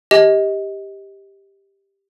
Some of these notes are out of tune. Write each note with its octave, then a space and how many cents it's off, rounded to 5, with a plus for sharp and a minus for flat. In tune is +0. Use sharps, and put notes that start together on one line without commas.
G4 +5 D#5 +25